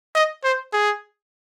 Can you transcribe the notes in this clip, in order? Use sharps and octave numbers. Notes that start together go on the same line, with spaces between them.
D#5
C5
G#4